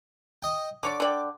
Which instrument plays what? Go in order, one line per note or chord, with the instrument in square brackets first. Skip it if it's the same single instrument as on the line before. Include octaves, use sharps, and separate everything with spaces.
[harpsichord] D#5 G5
[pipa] D3 C#5 D5 [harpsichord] D6
[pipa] D3 D5 G5